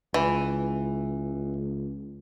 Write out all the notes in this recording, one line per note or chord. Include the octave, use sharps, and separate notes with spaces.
C#2 E3